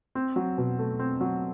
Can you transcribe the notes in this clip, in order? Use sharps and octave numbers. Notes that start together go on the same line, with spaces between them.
C4
F#3
B2
A3
C4
F#3